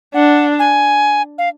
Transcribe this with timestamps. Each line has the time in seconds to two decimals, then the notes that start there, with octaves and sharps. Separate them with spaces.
0.14 D4 F#5
0.59 G#5
1.38 F5